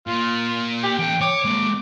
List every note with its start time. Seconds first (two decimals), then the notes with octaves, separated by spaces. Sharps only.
0.07 A#2 F4
0.83 G4
0.99 E3 A4 G5
1.21 C#5 D6
1.45 G#3 A#3